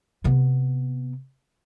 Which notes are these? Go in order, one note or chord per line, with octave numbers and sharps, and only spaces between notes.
C3 B3